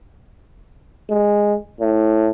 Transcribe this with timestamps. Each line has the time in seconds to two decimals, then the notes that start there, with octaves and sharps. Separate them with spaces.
1.10 G#3
1.80 A2